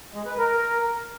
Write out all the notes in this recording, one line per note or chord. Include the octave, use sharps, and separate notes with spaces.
G#3
B4
A#4